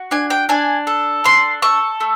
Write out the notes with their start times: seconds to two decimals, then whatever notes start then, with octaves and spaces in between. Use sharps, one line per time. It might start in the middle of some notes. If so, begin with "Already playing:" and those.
Already playing: F#4
0.11 D4 G#5
0.30 G5
0.49 D4 G#5
0.87 A4
1.24 D4 C6
1.62 A4 C#6
2.00 A3